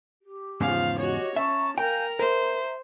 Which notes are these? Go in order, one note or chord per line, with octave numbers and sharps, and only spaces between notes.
G4
E2 G#2 C#3 F3 F5
F#4 G4 C#5 D#5
C#4 E5 A5 A#5 C#6
A#4 F5 G5 G#5 A#5 G6
A#4 C5 E5 A#5